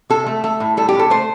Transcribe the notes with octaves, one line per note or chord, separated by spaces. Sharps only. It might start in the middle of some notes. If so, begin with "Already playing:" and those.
C3 A4
A3
A3 A4
A2
G3 A4
G4
A2 A4
A3 C5